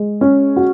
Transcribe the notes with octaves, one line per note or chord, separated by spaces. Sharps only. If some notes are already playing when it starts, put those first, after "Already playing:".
Already playing: G#3
C#4
F#4